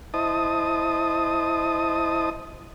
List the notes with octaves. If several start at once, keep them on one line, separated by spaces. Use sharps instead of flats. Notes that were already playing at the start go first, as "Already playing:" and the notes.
E4 C5 D#5 A5 D#6